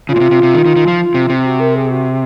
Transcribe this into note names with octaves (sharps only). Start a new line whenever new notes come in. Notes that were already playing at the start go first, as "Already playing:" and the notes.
C#3 F4
A#2
C3
C3
C3
D#3
D#3
D#3
F3
C3
C3
F#4
A#4
G#4
F#4